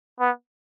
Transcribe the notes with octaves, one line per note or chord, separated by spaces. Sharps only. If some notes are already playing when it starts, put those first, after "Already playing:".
B3